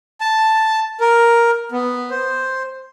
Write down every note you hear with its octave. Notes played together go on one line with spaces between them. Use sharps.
A5
A#4
B3
C5